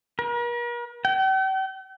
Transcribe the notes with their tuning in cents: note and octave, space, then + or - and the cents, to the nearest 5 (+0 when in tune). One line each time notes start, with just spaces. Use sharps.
A#4 +45
G5 -45